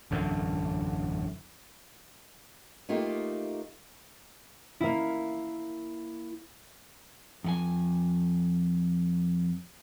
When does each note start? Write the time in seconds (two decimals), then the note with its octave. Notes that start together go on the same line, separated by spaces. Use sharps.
0.11 E1 A1 F#2 D3
2.89 A3 A#3 D#4 F4 G4
4.81 A#3 E4
7.44 F2 F#4 G#5